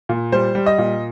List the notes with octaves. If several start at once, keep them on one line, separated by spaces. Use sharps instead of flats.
A#2
G3 C5
G3
D#5
A#2